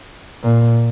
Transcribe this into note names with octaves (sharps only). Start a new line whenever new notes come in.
A#2